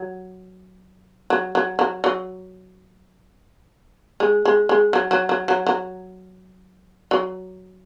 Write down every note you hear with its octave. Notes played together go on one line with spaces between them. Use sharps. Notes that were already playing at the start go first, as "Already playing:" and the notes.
Already playing: F#3
F#3
F#3
F#3
F#3
G#3
G#3
G#3
F#3
F#3
F#3
F#3
F#3
F#3